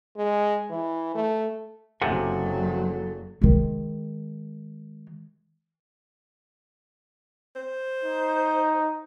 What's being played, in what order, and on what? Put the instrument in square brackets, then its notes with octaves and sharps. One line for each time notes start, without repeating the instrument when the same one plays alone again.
[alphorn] G#3
E3
A3
[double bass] F#1 F#3 [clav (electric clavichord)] C3 [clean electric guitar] A4 F#5 G#5
[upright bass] D#3 G#3
[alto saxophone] C5
[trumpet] D#4